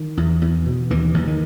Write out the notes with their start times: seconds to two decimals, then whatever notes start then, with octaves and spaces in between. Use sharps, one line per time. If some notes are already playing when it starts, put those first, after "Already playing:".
Already playing: D#3
0.17 E2
0.42 E2
0.66 B2
0.90 D#2 E3
1.14 D#2
1.27 D#3